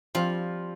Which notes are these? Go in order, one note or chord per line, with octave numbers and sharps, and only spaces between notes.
F3 G3 C4 F4